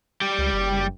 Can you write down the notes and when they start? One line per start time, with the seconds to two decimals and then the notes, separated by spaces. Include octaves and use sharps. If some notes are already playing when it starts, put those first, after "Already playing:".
0.21 G3 G4
0.39 C#2
0.53 F#1